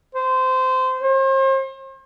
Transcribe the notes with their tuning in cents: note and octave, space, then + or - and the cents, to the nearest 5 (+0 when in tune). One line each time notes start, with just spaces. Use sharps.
C5 -20
C5 +40